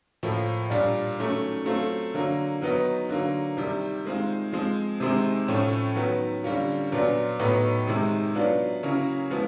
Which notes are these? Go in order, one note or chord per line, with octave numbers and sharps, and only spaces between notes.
A2 F3 A#3
A#2 G3 A#3 D4 F4
D#3 F#3 A3 C#4
F#3 A3 C4 F4
D3 F#3 A#3
D#3 F#3 B3 D#4
D3 F#3 A#3
C3 D#3 G3
D#3 G#3 C4 F4
F3 G#3 C4
C3 D#3 G#3 C4
A2 F3 A3 C#4
D#3 F#3 B3
D3 G3 A#3 C#4 F4
A#2 F#3 B3 D4 F4
A2 F#3 B3 D#4
C3 D#3 G#3
F#3 B3 D4 F4
C#3 F#3 A#3 C#4 E4
F3 G#3 B3 E4